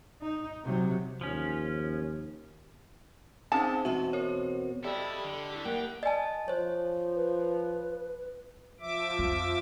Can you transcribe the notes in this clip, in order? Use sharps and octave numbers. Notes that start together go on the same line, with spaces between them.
D#4
C3 F#3
D#2 F3 C#4
C4 C#4 D#4 G#4 B4 C5 A5
E2 B2 C4 F#4 E5
A#4 C#5
G3 E4 A4 D#5
D3
E4 G4
A#3 E5 F#5 G5
D5 D#5 G#5 A5
F3 C5 C#5
B4
F3 E5 D6
F2